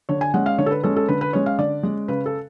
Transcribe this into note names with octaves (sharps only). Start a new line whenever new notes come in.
D3 C#5
G#5
G#3 C#4 F#5
F5
D3 C#5
A4
B4
G#3 C#4 A4
A4
D3 B4
B4
G#3 C#4 C#5
F5
D3 D5
G#3 C#4
C#3 B4
A4